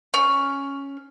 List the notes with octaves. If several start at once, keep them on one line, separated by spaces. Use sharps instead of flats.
C#4